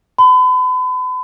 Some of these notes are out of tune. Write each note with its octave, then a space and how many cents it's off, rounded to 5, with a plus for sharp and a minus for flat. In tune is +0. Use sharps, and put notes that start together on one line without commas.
B5 +40